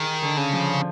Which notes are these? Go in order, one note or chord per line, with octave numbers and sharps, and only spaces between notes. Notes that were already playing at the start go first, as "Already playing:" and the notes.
Already playing: D#3 G#4
D3
C#3
F3